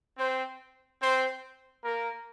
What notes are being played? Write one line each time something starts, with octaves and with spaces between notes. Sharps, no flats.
C4 C5
C4 C5
A#3 A#4